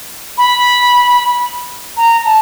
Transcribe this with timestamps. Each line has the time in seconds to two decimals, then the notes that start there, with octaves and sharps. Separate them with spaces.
0.38 B5
1.97 A#5
2.25 A5